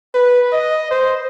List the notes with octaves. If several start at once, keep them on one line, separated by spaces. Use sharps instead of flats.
B4
D#5
C5